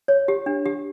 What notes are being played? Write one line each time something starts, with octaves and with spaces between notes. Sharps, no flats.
C#5
G4
D4
G4